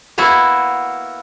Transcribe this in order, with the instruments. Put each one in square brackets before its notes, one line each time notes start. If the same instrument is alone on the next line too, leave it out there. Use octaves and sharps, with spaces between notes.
[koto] A#3 B3 E4 F#4 A5 A#5